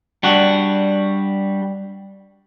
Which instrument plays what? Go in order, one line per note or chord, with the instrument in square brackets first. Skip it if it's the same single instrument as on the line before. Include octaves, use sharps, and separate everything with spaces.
[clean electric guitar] G3 D4 F#4